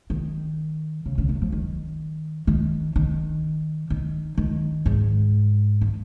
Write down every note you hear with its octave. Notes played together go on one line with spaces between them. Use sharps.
D#3
C#3
C#3
D#3
F3
D#3
D#3
D#3
D#3
D#3
G#2
D#3